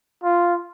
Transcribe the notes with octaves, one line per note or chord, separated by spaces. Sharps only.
F4